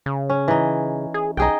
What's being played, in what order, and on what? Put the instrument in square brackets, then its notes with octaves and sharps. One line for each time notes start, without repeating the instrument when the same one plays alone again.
[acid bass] C#3
[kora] C#4
E3 D#4
[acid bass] G#4
[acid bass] B1 [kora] D#4 G#4 G5